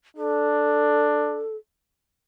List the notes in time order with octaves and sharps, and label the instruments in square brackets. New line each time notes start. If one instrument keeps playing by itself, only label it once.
[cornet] D4 [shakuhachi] A4